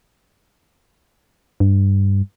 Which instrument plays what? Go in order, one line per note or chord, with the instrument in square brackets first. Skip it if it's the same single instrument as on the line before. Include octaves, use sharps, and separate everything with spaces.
[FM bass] G2